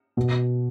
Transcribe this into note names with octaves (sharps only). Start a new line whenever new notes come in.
B2